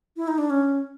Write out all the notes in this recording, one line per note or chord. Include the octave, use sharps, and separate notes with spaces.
E4
D#4
D4
C#4